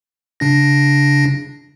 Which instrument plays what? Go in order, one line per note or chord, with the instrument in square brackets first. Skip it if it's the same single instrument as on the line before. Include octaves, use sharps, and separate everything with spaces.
[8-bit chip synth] C#3 D4 A#6